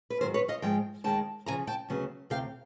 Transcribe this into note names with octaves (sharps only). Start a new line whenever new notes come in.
B4
G#2 D#3 F#3 A#4 C5
B4 C#5
D#5 F5
G#2 F3 G#3 G5
D#2 D#3 G#3 G5 A5
E2 C#3 F3 G#5 A#5
G5 A5
D2 C#3 F#3 B3
D2 C3 F5 G5